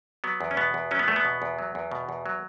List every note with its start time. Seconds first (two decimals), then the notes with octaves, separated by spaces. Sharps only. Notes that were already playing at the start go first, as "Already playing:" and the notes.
0.24 F#3 B3
0.41 E2
0.51 C#4
0.57 B2 B3
0.74 E2
0.91 F#3 C#4
0.99 B3
1.08 E2 A3
1.16 B3
1.25 B2
1.42 E2
1.59 F#3
1.75 E2
1.91 B2
2.09 E2
2.26 F#3